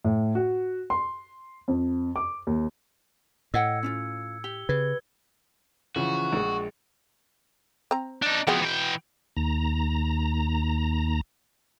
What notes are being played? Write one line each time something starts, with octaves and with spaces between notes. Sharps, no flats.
A2
F#4
C6
F2
D6
D#2
A2 D#5 F#5 G5 E6 G#6 C#7
C#4 E4 F4
G4 G7
C#3 B4 G#6
C#3 E3 F3 F#4
A#1 G#3
C4 A#5
D4 D#4
F3 G#3 B3 C4 F#4
E3 G5
D#2 A#5